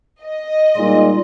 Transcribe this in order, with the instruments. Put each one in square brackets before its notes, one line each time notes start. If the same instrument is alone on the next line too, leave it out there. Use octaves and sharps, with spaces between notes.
[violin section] D#5
[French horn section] A#2 G#3 D#4 [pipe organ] G3 F4